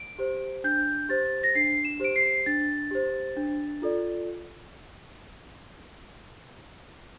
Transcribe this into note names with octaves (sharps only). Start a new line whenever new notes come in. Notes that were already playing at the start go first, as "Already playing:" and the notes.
Already playing: D7
G4 C5
D4 G6
G4 C5 A6
A#6
D4 C7
E7
G4 C5 D7
C7
D4 A6
G4 C5
D4
F4 A4 D5